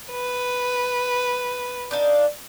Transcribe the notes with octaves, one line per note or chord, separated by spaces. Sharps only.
B4
D4 D#4 F5